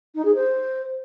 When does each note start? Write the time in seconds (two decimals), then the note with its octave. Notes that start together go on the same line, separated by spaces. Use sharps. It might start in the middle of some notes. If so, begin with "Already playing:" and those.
0.15 D#4
0.25 G#4
0.35 C5